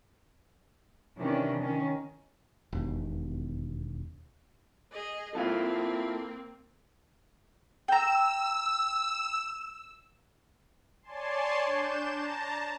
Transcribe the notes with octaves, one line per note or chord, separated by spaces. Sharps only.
C3 D#3 E3 C#4 D4
D#3 C#4
E1 D#2 B2
G#4 D#5
A#3 C4 E4 F4 A4
G5 A#5 E6
C#5 D5 G#5 A5 C6
D4 G6 E7
A5 A#5